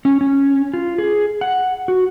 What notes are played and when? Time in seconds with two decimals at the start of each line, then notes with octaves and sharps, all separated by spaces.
0.05 C#4
0.21 C#4
0.74 F4
0.98 G#4
1.41 F#5
1.88 F#4